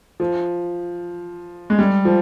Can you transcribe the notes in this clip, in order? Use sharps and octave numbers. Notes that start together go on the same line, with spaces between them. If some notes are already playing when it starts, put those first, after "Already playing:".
F3
G#3
G3
F3